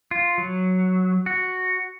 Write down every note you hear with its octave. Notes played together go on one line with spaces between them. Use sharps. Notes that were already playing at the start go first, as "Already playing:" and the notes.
F4
F#3
F#4